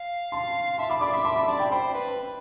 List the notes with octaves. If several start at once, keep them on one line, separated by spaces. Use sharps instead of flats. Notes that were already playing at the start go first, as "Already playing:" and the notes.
Already playing: F5
A5 C6
E5 A5 C6
B5 D6
D5 B5 D6
E5 B5 D6
E5 A5 C6
B5 D6
D5 A5 C6
G5 B5
C5 G5 B5
B4